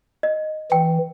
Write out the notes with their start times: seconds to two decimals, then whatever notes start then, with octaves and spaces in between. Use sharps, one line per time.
0.23 D#5
0.72 E3 G5